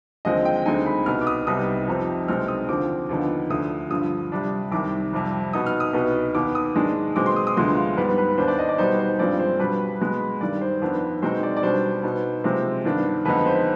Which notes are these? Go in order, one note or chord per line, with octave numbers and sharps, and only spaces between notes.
D#2 D3 F3 G#3 C4 D#5
G5
D2 D3 G#3 C4 D#4 G#5
B5
C2 B2 B3 D#4 F6
D6
D#6
C2 C3 G3 B3 D#4 D#6
F2 C3 F3 C4 D#4
C2 B2 G#3 C4 D#4 F6
D#6
D#2 D3 F3 C4 D6
D#2 D3 F3 B3 D#4
D2 D3 F3 D#6
G2 D3 F3 D#6
C3 G3 D4
C2 C3 D#3 G3 D6
F2 C3 G3
B2 B3 D#4 D#6
F6
D#6
C2 B2 B3 D#4
D#2 D#3 B3 D6
D#6
G#2 D#3 G#3 D4
B2 G#3 C4 D6
C6
D#6
D#6
D2 D3 F3 G#3 B3 C6
F5
G#2 G3 B3 B4
B4
D#2 D#3 B3 D4 C5
D5
D#5
D5
B2 G3 B3 D#4 C5
C5
G2 F3 G#3 C4 D5
C5
B2 G3 D4 B4
B2 G#3 B3
G2 D#3 G3 D5
C5
F2 D#3 B3 D4
B2 G#3 C4 D#4 C5
D5
D5
B2 G3 D4 C5
B2 B3 D#4
C3 F3 G#3 C4
G2 D#3 B3 D4
F2 D3 G#3 B3 D#4 B4
C5